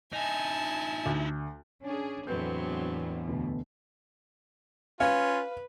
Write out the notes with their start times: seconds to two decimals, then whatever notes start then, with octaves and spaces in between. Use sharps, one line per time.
0.13 D#4 E4 G#5 A5
1.06 D2
1.83 C#4 D4 G#4
2.27 G1 E2 A2 F#3 C4 D4 B4 G6
3.28 D2 B2
5.00 C#4 F4 B4 F5